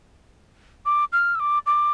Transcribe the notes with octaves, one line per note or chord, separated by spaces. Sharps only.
D6
F6
E6
D6
D6